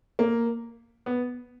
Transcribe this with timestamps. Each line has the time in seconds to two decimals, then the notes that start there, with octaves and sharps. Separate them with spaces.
0.19 A#3
1.06 B3